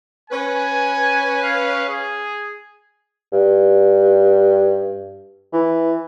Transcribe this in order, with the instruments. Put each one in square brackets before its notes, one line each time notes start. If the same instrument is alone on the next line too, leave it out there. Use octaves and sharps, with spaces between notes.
[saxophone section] C#4 B4 [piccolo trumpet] G#5
[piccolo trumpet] F5
G#4
[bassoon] G2
E3